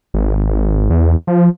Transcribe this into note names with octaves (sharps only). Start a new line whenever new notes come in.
G#1
E2
F3